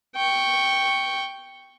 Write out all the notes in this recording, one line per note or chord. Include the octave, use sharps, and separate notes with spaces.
G5 C#6